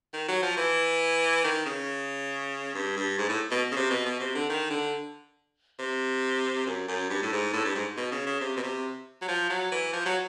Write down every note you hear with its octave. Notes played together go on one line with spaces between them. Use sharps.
D#3
F#3
F3
E3
D#3
C#3
G2
G2
G#2
A2
B2
C#3
C3
B2
B2
C3
D3
D#3
D3
C3
F#2
F#2
G2
A2
G#2
A2
G2
G#2
B2
C#3
C#3
C3
B2
C3
F#3
F3
F#3
E3
F3
F#3